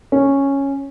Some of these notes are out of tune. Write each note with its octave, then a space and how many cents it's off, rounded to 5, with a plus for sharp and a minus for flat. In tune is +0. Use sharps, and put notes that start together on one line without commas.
C#4 -5